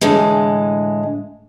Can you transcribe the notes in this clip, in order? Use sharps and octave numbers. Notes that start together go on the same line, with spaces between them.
A2 D3 E3 G#3